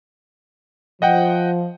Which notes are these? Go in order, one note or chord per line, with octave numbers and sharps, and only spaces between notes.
F3 D#5 F#5 G5